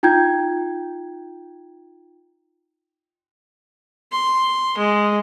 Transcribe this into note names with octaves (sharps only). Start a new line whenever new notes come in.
D#4 F4 G5 A#5 G6 G#6
C6
G#3